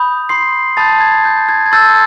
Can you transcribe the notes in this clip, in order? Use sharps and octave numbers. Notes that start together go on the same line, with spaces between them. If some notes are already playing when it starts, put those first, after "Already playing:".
Already playing: B5 D#6 G6
C6 C7
A5 B5 D#6 G6 A6
G#6
G6
G#6
G#6
A5 C6 E6 G6 A6